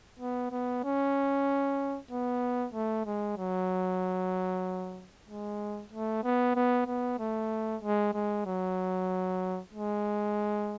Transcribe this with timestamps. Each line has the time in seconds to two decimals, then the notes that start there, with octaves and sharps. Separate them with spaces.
0.19 B3
0.51 B3
0.84 C#4
2.11 B3
2.74 A3
3.06 G#3
3.37 F#3
5.28 G#3
5.92 A3
6.23 B3
6.55 B3
6.86 B3
7.19 A3
7.82 G#3
8.13 G#3
8.46 F#3
9.73 G#3